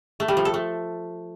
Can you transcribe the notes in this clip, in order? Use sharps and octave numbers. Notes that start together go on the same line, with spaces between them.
A3
G3
F3
A4
A3